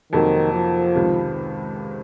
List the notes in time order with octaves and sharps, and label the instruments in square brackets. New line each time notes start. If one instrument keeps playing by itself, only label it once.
[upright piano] F2 C3 F#3 A#3 [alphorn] D#3
[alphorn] F3
[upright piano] C#2 C3 D#3